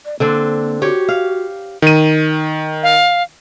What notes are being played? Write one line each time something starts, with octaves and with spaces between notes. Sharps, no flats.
D5
D3 A#3 C4 D4
F#4 G4 C#5
F5
D#3 D#7
F5